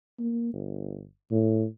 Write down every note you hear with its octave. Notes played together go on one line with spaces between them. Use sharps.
A#3
G1
A2